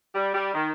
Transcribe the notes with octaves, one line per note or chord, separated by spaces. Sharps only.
G3
G3
D#3